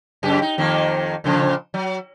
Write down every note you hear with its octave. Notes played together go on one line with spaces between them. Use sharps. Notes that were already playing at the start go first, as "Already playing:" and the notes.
F#2 C#3 G4
D#4
F2 D#3 A#3
A#2 C#3 F3
F#3